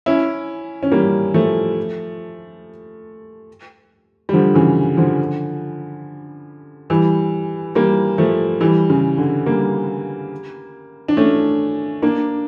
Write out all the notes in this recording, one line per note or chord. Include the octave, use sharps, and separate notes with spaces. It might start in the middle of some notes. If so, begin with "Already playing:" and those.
C#4 E4
C#4
G3 A#3
F3 A3
G3
D3 F3
C#3 E3
D3 F3
E3 G3
G3 A#3
F3 A3
E3 G3
C#3
D3
G3 A#3
D4
A3 C#4
A#3 D4